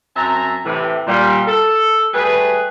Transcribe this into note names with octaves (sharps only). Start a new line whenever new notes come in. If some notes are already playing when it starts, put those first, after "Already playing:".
F#2 C4 E5 A5 A#5
A2 C3 E3
A#2 G3
A4
G3 A3 G#4 B4